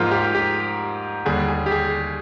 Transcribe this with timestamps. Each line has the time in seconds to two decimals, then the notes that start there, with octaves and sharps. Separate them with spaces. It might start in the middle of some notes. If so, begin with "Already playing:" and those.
Already playing: G#2 F3 A#3 F4
0.11 G4
0.35 G4
1.25 D#2 D3 G3 G#4
1.48 G#4
1.66 G4
1.72 G#4